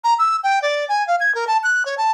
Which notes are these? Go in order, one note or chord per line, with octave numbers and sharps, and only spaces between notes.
A#5
E6
G5
D5
G#5
F5
G#6
A#4
A5
F#6
C#5
A5